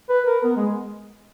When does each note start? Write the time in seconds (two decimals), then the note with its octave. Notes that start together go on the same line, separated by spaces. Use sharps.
0.10 B4
0.26 A#4
0.44 B3
0.57 G#3